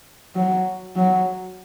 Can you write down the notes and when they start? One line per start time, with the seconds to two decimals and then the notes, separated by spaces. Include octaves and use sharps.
0.35 F#3
0.96 F#3